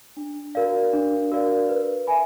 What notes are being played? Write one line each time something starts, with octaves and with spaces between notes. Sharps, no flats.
D4
F#4 A#4 D5 F5
D4
F#4 A#4 D5 F5
B4
E5 G#5 B5